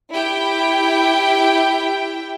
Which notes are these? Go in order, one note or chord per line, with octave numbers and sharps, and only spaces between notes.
E4 G4 G5